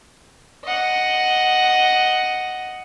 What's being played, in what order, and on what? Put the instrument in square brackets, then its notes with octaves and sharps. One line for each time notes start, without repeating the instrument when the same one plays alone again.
[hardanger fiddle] D#5 F#5